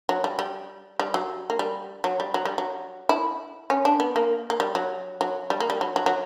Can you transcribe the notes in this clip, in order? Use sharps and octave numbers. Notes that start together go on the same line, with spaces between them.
F#3
G3
G3
G3
F#3
A#3
G3
F#3
G3
F#3
G3
F#3
E4
C#4
D4
B3
A#3
A#3
G3
F#3
F#3
G3
A#3
G3
F#3
F#3
F#3